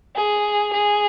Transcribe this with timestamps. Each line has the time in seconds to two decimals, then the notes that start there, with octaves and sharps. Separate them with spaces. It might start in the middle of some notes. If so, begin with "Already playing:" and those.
0.16 G#4
0.73 G#4